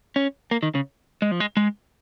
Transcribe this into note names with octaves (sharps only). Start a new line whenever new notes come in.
C#4
A#3
D#3
C#3
G#3
F3
G#3
G#3